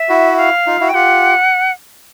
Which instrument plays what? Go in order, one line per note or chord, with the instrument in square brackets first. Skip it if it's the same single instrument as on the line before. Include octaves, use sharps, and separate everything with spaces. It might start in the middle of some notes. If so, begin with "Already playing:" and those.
Already playing: [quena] E5
[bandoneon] E4 F#4
[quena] F5
[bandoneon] D#4 F4
E4 F#4
[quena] G5
[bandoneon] F4 G4 [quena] F#5